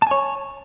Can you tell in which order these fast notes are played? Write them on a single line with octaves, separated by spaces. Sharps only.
A5 G#5 C#5